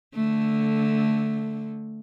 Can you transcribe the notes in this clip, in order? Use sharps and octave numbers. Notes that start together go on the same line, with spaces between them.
D3 A3